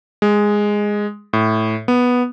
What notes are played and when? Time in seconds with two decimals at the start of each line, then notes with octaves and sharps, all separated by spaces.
0.22 G#3
1.33 A2
1.88 B3